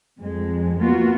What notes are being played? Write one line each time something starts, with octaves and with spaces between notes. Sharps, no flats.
F2 G#3
A#3 B3 F4 F#4